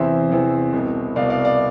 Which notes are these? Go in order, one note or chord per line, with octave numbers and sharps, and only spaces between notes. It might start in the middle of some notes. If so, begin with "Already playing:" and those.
Already playing: E2 C3 E3 C5 E5
E2 C3 E3
C2 B2
C2 B2 D5 F5
D5 F5
D5 F5